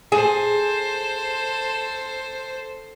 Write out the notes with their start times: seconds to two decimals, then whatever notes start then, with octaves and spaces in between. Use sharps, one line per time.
0.12 G#4 A4 C5